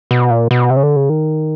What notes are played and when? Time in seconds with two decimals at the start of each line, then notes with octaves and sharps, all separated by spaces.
0.11 B2
0.30 A#2
0.51 B2
0.70 C3
0.77 C#3
0.83 D3
0.96 C#3
1.09 D#3